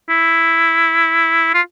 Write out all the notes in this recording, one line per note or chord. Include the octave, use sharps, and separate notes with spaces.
E4
F4